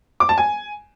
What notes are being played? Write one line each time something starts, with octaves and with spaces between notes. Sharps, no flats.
D6
A5
G#5